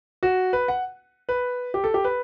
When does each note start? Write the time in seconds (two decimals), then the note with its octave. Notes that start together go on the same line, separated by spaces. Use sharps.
0.23 F#4
0.53 B4
0.68 F#5
1.29 B4
1.74 G4
1.84 A4
1.94 G4
2.05 B4